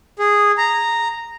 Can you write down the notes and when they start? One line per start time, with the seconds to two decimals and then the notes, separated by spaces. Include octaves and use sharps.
0.19 G#4
0.58 A#5